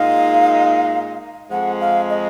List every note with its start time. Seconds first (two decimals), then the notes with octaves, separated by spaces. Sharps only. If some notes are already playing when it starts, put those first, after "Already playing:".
Already playing: A#2 G#3 D#4 F5
1.51 F2 F3 G#3 F#5
1.81 F5
2.10 D#5